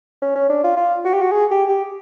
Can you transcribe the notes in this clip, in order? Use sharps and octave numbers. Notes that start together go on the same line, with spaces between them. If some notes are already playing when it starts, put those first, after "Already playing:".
C#4
C#4
D4
F4
F4
F#4
G4
F#4
G#4
G4
G4